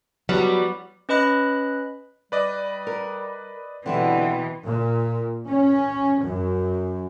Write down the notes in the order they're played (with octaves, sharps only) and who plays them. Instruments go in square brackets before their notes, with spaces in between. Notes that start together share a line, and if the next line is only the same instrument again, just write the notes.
[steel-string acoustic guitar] F#3 [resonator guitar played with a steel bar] G3 B3
[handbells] C#4 B4 D#5 B5 F#6
[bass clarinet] G3 [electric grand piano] B4 D5 D#5
[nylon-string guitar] A#4
[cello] B2 E3 [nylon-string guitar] D3 G3 E4 [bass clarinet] C4
[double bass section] A#2
C#4
F#2